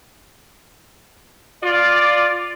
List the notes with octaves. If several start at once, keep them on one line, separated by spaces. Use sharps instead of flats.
F4 D5